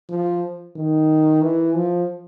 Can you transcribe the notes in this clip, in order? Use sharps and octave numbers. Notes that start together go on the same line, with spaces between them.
F3
D#3
E3
F3